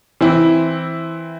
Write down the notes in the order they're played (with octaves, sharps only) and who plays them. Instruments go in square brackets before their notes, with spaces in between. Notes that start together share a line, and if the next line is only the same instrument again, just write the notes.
[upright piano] E3 C4 E4